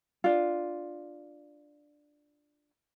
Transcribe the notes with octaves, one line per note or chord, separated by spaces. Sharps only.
D4 F4